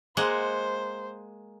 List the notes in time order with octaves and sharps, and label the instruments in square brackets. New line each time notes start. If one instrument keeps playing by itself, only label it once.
[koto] G#3 A#3 F#5 [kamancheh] C5